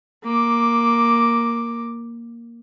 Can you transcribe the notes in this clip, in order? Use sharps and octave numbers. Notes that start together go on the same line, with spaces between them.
A#3 D6